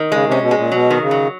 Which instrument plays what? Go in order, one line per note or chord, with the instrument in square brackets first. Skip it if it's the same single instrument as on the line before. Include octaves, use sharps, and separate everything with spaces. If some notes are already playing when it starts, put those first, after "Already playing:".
Already playing: [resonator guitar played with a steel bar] D#3
[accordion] C#3 [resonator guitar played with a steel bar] G#3
[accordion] C3
[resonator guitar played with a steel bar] C#4
[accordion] B2
[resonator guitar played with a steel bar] G#3
[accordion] A#2
[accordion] B2 [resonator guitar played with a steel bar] F#3
[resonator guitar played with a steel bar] D#3
[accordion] C#3
[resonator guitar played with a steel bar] F#3